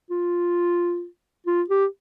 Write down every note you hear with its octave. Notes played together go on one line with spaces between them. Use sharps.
F4
F4
G4